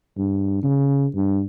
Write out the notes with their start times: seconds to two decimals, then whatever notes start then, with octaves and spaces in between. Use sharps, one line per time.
0.18 G2
0.63 C#3
1.16 G2